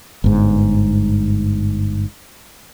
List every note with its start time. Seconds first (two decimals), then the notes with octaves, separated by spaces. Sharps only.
0.24 G1 G#2